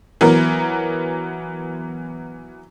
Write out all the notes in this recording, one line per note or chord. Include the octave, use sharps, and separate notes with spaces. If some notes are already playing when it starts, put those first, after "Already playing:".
E3 F#3 B3 A#4